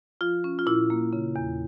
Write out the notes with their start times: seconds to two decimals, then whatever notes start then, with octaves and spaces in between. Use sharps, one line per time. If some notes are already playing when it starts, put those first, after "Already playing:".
0.21 F3 F4
0.44 C#4
0.59 F4
0.67 A#2 E4
0.90 A#3
1.13 C#3
1.36 E2